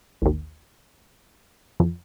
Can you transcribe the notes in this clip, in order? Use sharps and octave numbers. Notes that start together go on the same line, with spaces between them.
A1 D#2
F2